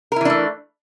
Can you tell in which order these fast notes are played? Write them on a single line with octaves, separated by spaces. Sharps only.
A#4 E4 E3 D4 A3